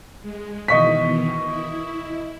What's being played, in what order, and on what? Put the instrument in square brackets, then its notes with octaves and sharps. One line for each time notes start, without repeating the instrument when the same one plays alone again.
[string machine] G#3
[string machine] B2 D#3 E3 [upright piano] D#5 C#6 B6
[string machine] E4